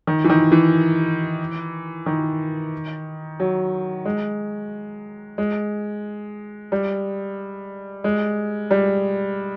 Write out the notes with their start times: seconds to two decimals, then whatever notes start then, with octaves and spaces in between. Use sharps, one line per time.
0.07 D#3
0.24 E3
0.30 D#3
0.52 E3
2.06 D#3
3.40 F#3
4.05 G#3
5.38 G#3
6.72 G3
8.04 G#3
8.71 G3